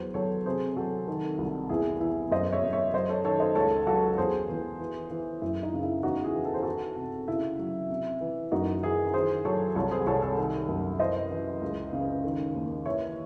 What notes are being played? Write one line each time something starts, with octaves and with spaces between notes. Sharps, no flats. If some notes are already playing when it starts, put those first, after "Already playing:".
Already playing: E2 F#3 C5
F#3 A4 C#5
C3 G#4 C5
F#3 F#4 A4
D#3
C2
E2 E4 G#4
E2 E4
F#2 C5 D#5
C#5 E5
F#2
C#5 E5
F#3 C5 D#5
A4 C#5
D#3 A4 C#5
C5 D#5
C#2 A4 C#5
F#3 F#4 A4
E2 G#4 C5
E2
E3
E3
F#2 E4
D#4
C#3
E4
E2 D#4 F#4
E4 G#4
E3
A4
C5
E3 F#4 A4
C3
C#3 E4
F#3
C3
E3
F#2 D#4 F#4
E3 E4 G#4
D#3 G#4 C5
F#3 A4 C#5
C2 A4 C#5
G#4 C5
C2 A4 C#5
A4 C#5
D#3
F#2
E3 C5 D#5
E3
C#2
C#3
D#3
D#2
E3 C#5 E5